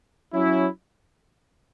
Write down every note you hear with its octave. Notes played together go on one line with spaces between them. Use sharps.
F#3 C#4 E4